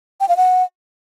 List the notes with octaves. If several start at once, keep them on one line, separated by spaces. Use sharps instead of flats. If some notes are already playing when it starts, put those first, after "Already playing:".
G5
F5
F#5